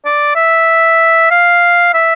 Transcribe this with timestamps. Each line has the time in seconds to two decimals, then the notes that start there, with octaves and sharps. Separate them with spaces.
0.05 D5
0.35 E5
1.30 F5
1.94 E5